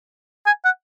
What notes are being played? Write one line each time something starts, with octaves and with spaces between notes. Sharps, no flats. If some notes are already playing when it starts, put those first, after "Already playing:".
G#5
F#5